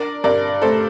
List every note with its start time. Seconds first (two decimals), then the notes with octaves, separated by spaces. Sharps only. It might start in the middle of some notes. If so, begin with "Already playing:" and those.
Already playing: D4 A#4 D5
0.24 G2 A#4 D5
0.62 A3 A4 C5